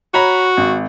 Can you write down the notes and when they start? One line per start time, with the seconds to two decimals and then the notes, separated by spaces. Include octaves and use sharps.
0.14 F#4 C#5 A#5 B5
0.57 G#1